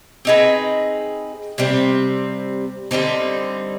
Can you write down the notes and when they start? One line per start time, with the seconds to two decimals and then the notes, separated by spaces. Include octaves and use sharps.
0.25 C4 D#4 G#4 B4
1.58 C3 G3 C4
2.91 D3 G3 C4 D#4